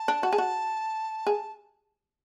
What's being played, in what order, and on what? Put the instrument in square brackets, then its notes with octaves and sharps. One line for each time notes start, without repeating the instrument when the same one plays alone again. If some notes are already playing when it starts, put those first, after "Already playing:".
Already playing: [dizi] A5
[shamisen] D4
F#4
G#4
F#4
G#4